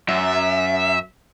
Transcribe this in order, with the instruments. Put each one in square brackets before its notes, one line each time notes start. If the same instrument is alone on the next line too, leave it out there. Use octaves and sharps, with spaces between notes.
[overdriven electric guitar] F#2 [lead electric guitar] E5